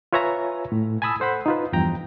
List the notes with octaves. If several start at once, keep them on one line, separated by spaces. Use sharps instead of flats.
F4 B4 C#5 E5 G#5 A#5
A2
G#5 A5 B5 D#6 E6
A4 C5 F#5 B5
D#4 F4 B4
E2 G2 F3 G5 A#5